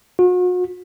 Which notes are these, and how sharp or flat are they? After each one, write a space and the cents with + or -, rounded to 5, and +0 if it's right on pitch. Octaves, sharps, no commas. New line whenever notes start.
F#4 -40